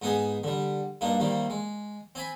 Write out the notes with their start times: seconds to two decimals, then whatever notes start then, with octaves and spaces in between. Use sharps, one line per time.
0.02 G#2 B3 D#4 G#4 G#5
0.44 D3 G3
1.01 G2 A#3 D4 D#4
1.20 C3 D#3 G3 A#3
1.50 G#3
2.15 C4 G#5 B5